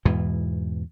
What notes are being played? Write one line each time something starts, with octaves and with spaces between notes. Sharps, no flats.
E2 G#2 B2 E3